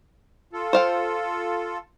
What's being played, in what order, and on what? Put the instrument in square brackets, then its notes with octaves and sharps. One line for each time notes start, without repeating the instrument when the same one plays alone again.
[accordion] F4 A4
[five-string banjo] C5 F5 G5